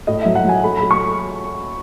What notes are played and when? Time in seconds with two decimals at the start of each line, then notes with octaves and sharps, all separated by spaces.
0.07 A2 D#5
0.22 F#3 E5
0.35 F#5
0.44 F#3 G#5
0.64 A3 B5
0.77 A3 B5
0.91 C#6